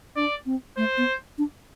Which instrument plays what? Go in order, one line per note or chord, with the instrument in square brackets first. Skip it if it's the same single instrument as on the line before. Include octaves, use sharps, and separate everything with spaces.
[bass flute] D4 [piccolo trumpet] D5
[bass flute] C4
[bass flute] A3 [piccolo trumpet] C5
[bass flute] B3
D4